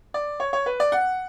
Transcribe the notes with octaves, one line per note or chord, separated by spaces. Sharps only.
D5
C#5
C#5
B4
D5
F#5